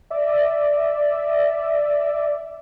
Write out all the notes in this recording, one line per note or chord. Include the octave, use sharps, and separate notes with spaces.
D5 E5